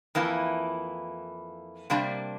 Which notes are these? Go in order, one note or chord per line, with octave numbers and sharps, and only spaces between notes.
F2 E3 A#3 E4
C3 G3 A#3 D4